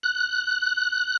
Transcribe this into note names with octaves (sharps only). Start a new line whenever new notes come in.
F#6